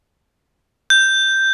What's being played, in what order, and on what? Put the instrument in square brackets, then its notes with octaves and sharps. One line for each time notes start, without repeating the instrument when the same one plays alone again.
[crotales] G6